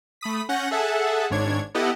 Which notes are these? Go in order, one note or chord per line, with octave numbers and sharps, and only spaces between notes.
A3 B5 D#6 B6
C#4 F#5 G6 A#6
G#4 A4 E5 F#5 A5
G#1 G#2 D4 C#5 G#6
B3 E4 G4 A4 D#5 F#5